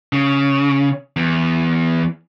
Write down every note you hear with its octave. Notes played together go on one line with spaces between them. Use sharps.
C#3
E2